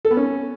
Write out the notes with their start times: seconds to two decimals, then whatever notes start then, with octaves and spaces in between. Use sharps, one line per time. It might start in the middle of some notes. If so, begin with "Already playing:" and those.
0.05 A4
0.11 B3
0.17 C#4